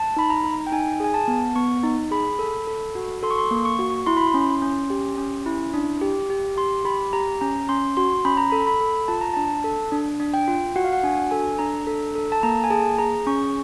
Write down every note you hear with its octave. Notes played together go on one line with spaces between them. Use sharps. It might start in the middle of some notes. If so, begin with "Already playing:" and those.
Already playing: A5
D#4 B5
A#5
D#4
G5
D#4 G#5
G#4 G#5
A5
B3
B3 C#6
D#4
G#4 B5
A4
A4
F#4
A4 C6
C#6
C6
A#3
C#6
F#4
E4 C6
B5
C6
C#4
C#4
G4
C#4
E4
D4
G4
G4
G4 C6
G4 B5
G4 A#5
C#4 A#5
C#4 C6
F#4 C6
C#4 B5
A#5
A4 B5
B5
A4
F4 A5
A#5
D4 A5
A4
D4
D4
G5
F4
F#4 F#5
F5
F#5
D4 G#5
A4 G#5
D4 A#5
A4
A4
A5
A#3 A#5
G#5
G#4 A5
G#4 A#5
C#4 C#6